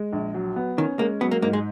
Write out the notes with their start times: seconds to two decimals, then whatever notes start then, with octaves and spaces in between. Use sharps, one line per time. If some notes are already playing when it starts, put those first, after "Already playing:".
Already playing: G#3
0.13 A#1
0.34 F#3
0.56 B3
0.78 D#3 C#4
0.99 G#3 A#3
1.21 F#3 B3
1.31 A#3
1.42 G#2 A#3
1.53 G#3